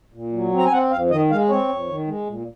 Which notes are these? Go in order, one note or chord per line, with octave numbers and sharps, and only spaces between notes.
A#2
F#3
C4
A#5
G#5
C4 F#5
F2 F5
D#3 D#5
G#3 F5
C4 C#5
F2
D#3
G#3
A#2